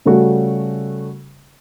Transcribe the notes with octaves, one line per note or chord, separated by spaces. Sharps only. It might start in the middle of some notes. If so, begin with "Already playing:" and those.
C#3 G3 A3 C#4 F#4